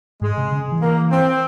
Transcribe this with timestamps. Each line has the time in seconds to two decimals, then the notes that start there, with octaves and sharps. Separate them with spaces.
0.21 G#2 G#3
0.38 C3
0.52 C#3
0.72 E3
0.81 A#3
1.11 C4